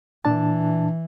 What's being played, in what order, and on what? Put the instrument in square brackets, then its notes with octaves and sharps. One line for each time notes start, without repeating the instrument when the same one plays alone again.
[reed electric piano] A#2 D4 A5 [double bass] E3